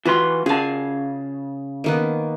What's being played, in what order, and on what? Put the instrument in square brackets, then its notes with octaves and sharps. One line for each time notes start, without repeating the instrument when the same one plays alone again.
[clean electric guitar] E3 B4 C6 [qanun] F4 F#4
[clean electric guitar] C#3 A5 [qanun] G#4 F5
[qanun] D#3 A#3 B3